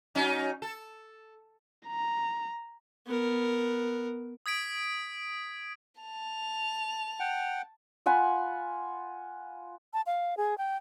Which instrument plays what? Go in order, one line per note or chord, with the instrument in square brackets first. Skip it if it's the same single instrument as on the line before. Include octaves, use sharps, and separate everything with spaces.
[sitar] F#3 C#4 D#4
A4
[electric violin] A#5
[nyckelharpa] B3 A#4
[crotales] D#6 G#6 B6 D7
[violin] A5 F7
[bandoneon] F#5 G5
[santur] F4 F#5 G#5 B5
[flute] A5
F5
G#4
G5